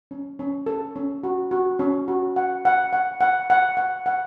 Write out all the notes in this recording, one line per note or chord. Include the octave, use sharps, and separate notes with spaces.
C#4
C#4
A4
C#4
F#4
F#4
C#4
F#4
F#5
F#5
F#5
F#5
F#5
F#5
F#5